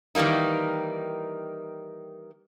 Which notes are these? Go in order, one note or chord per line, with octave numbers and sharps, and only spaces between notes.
D#3 E3 G3 A#3 D#4